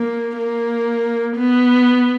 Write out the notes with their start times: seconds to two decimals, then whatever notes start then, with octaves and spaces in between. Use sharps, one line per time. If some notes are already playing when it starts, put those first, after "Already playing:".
Already playing: A#3
0.38 A#3
1.36 B3